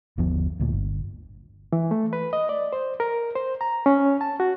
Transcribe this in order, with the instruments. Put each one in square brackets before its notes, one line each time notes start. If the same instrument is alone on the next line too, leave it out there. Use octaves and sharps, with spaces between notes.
[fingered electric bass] G1 D#2 F3 B3
D2 A#2
G1
[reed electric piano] E3
A3
B4
D#5
D5
C5
A#4
C5
A#5
C#4
A5
F#4